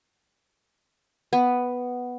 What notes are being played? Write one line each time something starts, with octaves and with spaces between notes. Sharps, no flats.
B3